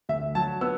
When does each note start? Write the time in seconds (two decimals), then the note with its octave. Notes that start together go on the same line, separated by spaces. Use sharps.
0.09 D2 E5
0.35 F#3 A5
0.61 B3 E6